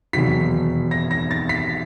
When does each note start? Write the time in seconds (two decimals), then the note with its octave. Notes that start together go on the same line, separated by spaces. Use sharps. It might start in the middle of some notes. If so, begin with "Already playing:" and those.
0.13 E1 D#2 D#3 F#3 B6
0.91 A#6
1.11 A#6
1.31 A6
1.49 B6